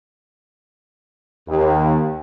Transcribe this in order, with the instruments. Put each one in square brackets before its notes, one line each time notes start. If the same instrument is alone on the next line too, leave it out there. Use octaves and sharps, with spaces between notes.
[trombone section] D#2